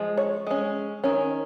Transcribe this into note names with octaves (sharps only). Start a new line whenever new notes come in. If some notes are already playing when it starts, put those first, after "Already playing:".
Already playing: F3 G#3
C#5
G#3 C#4
D#3 C#4